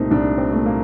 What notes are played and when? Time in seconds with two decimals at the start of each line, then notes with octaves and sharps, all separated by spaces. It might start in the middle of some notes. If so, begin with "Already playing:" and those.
Already playing: C2 A#2 A3 C4 D#4
0.11 C2 D4
0.38 C4
0.52 A#2 A3
0.66 A#3